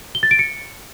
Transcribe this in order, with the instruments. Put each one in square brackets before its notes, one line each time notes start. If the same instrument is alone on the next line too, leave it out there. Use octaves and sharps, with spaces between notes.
[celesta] G7
A6
D7
C#7